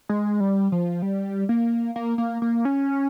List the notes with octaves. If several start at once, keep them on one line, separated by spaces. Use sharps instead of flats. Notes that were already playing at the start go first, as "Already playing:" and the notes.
G#3
G3
F3
G3
A#3
A#3
A#3
A#3
C#4